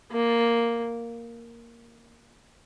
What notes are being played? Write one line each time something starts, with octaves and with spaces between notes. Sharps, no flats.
A#3